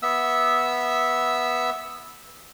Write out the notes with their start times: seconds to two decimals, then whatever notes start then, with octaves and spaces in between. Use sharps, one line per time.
0.03 B3 E5 E6